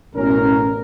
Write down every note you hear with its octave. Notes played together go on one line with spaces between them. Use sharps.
A1 B2 C#4 A#4